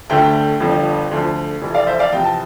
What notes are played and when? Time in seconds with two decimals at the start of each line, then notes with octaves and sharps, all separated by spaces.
0.09 D2 D3 A3 E5 G5
0.60 G1 F2 D3
1.11 D2 D3 F3
1.61 F1 F2 E3
1.74 D5 F5
1.87 C5 E5
1.99 D5 F5
2.12 E2 C3 F3 G5
2.24 A5